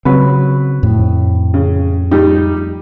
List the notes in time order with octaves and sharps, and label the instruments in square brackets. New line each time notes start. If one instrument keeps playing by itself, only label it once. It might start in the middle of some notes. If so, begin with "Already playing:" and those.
[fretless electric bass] C#3 C4 [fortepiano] F#3 B4
[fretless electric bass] F2 A2
[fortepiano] C#3
G3 D#4 G4